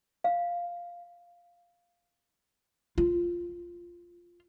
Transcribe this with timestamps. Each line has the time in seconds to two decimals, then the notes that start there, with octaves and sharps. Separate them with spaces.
0.24 F5
2.98 F4